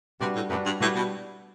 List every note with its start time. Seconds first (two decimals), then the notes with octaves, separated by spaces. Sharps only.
0.21 C3 G3 D4 F#4 B4
0.36 A2
0.50 F#2 G3 D4 F#4 B4
0.66 G2
0.80 A2 G3 D4 F#4 B4
0.96 B2